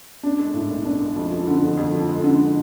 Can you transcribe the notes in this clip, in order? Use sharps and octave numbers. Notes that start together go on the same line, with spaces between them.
D4
G#3
A2
B1
D4
G#3
F2
F3
D3
F2
F2
F3
G#3
D3